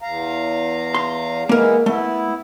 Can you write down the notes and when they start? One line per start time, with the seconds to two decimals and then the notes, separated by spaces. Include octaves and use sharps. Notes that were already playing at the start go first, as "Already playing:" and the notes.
0.02 E2 F5 A#5
0.94 C6
1.49 E3 G#3 A#3 B3 A#4
1.86 A3 B3 E4